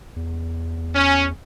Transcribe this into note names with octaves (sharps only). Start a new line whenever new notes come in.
E2
C#4